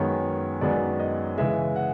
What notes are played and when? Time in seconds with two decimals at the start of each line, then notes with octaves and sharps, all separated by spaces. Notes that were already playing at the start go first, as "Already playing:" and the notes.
Already playing: F#2 D#3 G#3 B3 C#5
0.61 F#2 D#3 G#3 B3 D5
0.99 D#5
1.38 C#3 E3 G#3 E5
1.76 F#5